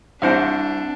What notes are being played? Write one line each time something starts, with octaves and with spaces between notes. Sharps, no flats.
C2 C4 D4 E4 C5 F#5